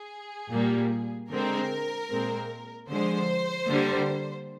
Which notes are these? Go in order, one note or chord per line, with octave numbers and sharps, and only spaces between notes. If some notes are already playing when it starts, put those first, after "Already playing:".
Already playing: G#4
A#2 G3 A#3
D3 G#3 C4 A#4
A#2 G#3 C4
D3 F3 G#3 C5
D3 G3 A#3